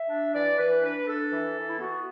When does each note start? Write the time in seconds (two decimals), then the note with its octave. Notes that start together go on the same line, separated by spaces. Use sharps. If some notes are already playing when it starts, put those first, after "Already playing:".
Already playing: E5
0.09 D4
0.33 E3 D5
0.57 E3 B4
0.82 D4 B4
1.06 D4 A4
1.30 E3
1.55 E3
1.67 E4
1.79 B3 F#4